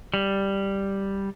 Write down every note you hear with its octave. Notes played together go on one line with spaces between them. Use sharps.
G3